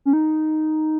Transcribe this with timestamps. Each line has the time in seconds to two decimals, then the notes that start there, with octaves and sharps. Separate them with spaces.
0.05 C#4
0.13 D#4